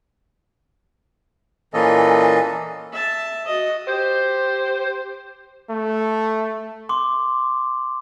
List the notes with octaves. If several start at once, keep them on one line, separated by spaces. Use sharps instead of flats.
A#2 E3 A#3 C#4 A4 D#5
E5 A5
F#4 D#5
G4 C5
A3
C6 D6